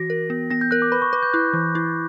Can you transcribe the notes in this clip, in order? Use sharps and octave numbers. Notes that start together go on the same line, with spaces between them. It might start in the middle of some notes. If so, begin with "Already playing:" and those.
Already playing: E3 F#4 A#6
A#4
B3
B3 A#6
G6
A#4 F#6
D6
B4 B5
C#6
B4 D6
G6
E4 F#6
E3
E4